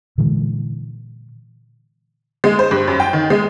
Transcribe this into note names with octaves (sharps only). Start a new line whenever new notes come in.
A#2 D3 E3 G#3
G#3
C5
G2
F#2
G5
D#3
G#3